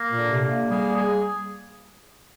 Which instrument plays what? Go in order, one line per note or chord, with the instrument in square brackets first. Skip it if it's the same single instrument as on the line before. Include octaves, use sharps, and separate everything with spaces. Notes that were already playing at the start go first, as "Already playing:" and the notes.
Already playing: [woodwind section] A#3
[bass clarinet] A#2
[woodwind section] D3
[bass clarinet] C3
[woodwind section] A#3
[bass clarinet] G3 [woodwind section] G#4
[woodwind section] G#4